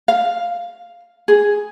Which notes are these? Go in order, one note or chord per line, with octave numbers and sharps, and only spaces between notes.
F5
G#4